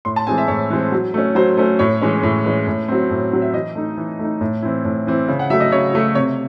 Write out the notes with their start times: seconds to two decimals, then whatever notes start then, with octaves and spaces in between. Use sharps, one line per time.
0.05 A2 C6
0.16 A5
0.27 E3 G#3 C4 G#5
0.38 E5
0.48 A2 C#5
0.70 E3 G#3 C4
0.92 F#3
1.14 A3 C#4
1.35 F#3 C5
1.57 A3 C#4
1.79 A2 C#5
2.02 E3 G#3 C#4
2.23 A2
2.44 E3 G#3 C#4
2.67 A2
2.88 F#3 C4
3.10 A2
3.32 F#3 C4
3.42 E5
3.54 E3 D#5
3.75 A3 D#4
3.97 E3
4.19 A3 D#4
4.41 A2
4.62 E3 C4 E4
4.85 A2
5.07 E3 C4 E4
5.28 C#3
5.39 F#5
5.50 F#3 A3 E5
5.60 D#5
5.72 C#3 C#5
5.94 F#3 A3
6.15 C3 C#5